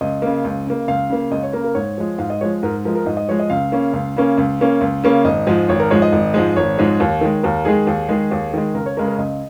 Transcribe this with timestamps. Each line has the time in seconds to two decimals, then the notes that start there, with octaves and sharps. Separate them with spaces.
0.01 C#2 D#5
0.22 C#3 A#3
0.44 C#2
0.67 C#3 A#3
0.88 C#2 F5
1.10 C#3 A#3
1.31 C#2 D#5
1.43 C#5
1.53 C#3 A#3 A#4
1.64 A#4
1.75 G#2 C#5
1.98 F3 G#3
2.18 G#2 F5
2.30 D#5
2.41 F3 G#3 C#5
2.63 G#2 A#4
2.85 F3 G#3 A#4
2.95 A#4
3.06 G#2 D#5
3.17 D#5
3.28 F3 G#3 C#5
3.40 D#5
3.50 C#2 F5
3.72 C#3 A#3 C#4
3.93 C#2
4.16 C#3 A#3 C#4
4.38 C#2
4.60 C#3 A#3 C#4
4.81 C#2
5.03 C#3 A#3 C#4
5.24 G#1 D#5
5.47 G#2 F3 G#3
5.69 G#1 C#5
5.80 A#4
5.91 G#2 F3 G#3 C#5
6.02 D#5
6.12 G#1
6.34 G#2 F3 G#3
6.57 G#1 C#5
6.78 G#2 F3 G#3
7.00 D#2
7.21 D#3 G#3
7.43 D#2 A#4
7.65 D#3 G#3 G#4
7.87 D#2
8.09 D#3 G#3
8.31 D#2
8.54 D#3 G#3
8.74 C#2 A#4
8.86 C#5
8.97 C#3 G#3 C#4 A#4
9.07 A#4
9.18 C#2 D#5